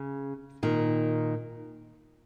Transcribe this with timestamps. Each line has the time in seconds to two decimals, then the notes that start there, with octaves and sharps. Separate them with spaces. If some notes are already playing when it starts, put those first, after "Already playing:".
Already playing: C#3
0.63 A#2 D#3